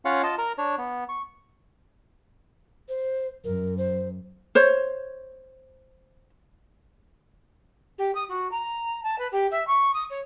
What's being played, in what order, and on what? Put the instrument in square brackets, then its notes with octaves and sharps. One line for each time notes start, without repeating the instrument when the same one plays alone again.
[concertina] C#4 F4 C#5 F5 F#5
F4 D#5 A5
A#4 A#5
D4 C#5
B3
C#6
[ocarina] C5
[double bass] F#2 [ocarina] A#4
[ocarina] C5
[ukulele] C5 C#5
[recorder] G4
D#6
F#4
A#5
A5
B4
G4
E5
C#6
D#6
C#5